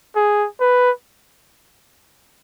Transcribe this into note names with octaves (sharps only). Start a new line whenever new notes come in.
G#4
B4